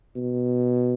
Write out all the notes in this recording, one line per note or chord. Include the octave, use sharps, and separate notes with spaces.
B2